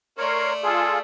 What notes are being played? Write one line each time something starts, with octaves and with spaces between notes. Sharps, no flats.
A3 A#4 C#5 D5 C6
F4 G#4 A4